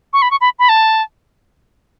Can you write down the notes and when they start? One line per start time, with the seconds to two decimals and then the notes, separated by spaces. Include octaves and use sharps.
0.13 C#6
0.22 B5
0.31 C#6
0.41 B5
0.59 B5
0.69 A5